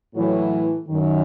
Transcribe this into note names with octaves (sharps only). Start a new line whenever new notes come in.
A2 E3 F#3
F#2 D#3